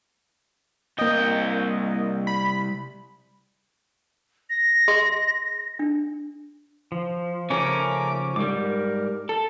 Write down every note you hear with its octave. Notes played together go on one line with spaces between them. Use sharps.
C2 A#3 D#5 G5
B5
A#6
G#4 D#5 C6
D4
F3
C#3 F3 A3 C#4 A#4 C#5 D6
G#2 G3 A#4 D6
A4